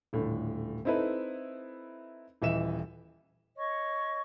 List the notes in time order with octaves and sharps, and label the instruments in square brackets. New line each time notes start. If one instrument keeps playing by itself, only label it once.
[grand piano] D#1 A2 D3
C4 D#4 E4 A4 B4
D#1 E3 D#5 E5 E7
[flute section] C#5 D#5 C#6